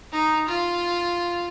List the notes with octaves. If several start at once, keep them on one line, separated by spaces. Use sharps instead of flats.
D#4
F4